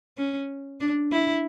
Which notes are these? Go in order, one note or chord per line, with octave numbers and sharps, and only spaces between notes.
C#4
D4
E4